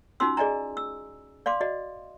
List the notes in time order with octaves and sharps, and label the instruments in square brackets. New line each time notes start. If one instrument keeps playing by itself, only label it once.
[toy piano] C#4 D#4 F4 F#4 C6 E6
G#4 D5 D#5 G#5 A#5
E6
D5 F5 C6 D6
F#4 D5 D#5